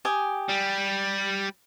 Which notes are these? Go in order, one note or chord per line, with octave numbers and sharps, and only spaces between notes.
G4 G#5 D#6
G3